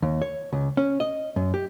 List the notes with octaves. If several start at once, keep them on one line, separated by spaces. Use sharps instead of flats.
D#2
C#5
C#2
C#4
D#5
F#2
G4